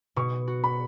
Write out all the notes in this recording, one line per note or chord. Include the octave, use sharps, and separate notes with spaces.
B2 C#6
F#4
B5